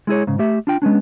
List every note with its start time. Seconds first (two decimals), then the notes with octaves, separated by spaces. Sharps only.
0.07 G#3 E4 G#4 C#5
0.27 G#2 C#3
0.39 A3 G4 E5
0.67 D4 F4 G5
0.82 G#3 B3 C#4 D4